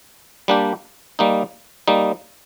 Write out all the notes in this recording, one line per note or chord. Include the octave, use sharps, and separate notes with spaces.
G3 A#3 D4 G4
G3 A#3 D#4
G3 A#3 D#4